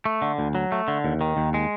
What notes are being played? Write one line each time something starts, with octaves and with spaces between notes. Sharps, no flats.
A3
D3
D2
F#3
A3
D3
D#2
D#3
D#2
G#3